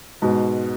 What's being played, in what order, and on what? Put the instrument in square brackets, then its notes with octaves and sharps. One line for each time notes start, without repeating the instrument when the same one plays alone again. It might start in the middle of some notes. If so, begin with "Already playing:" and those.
[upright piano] G#2 B2